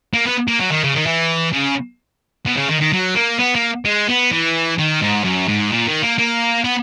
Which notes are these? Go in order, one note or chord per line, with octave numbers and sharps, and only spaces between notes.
A#3
B3
A#3
F#3
D#3
C#3
D#3
E3
C#3
B2
C#3
D#3
D#3
F#3
A#3
B3
A#3
G#3
B3
E3
D#3
G#2
F#2
G#2
A#2
D#3
A#3
A#3
B3